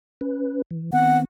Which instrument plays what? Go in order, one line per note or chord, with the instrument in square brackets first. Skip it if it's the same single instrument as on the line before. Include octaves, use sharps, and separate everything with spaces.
[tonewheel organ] C#4 B4
E3
[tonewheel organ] D#3 B3 C4 [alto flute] F#5